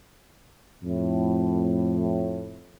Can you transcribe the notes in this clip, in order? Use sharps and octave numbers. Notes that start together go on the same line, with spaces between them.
F2 A2